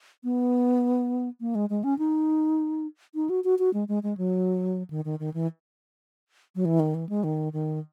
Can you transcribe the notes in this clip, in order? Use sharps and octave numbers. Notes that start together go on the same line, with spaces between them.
B3
A#3
G#3
G#3
C#4
D#4
D#4
F#4
F#4
F#4
G#3
G#3
G#3
F#3
D#3
D#3
D#3
E3
F#3
E3
D#3
E3
G#3
D#3
D#3